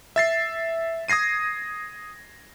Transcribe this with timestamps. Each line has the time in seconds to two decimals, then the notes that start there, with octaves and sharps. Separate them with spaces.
0.16 E5 A6 C7
1.08 D#6 G#6 A#6 C7 D#7